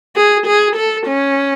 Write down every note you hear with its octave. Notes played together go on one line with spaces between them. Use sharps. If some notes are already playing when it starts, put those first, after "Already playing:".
G#4
G#4
A4
C#4